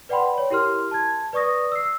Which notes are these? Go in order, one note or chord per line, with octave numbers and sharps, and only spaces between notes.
B4 D5 F#5 G5 B5 C6
C#5
E4 G4 A#4 C6 F6
A5 G#6
B4 D5 C#6 D#6 A#6
E6 C7